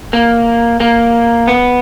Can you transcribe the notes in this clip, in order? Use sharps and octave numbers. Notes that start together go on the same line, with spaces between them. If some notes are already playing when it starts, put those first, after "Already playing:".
A#3
A#3
B3